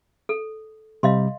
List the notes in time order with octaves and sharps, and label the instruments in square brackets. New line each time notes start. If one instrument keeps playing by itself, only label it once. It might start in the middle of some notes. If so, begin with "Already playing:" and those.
[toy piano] A4
[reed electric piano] C3 G3 [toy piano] D#5 F5 C6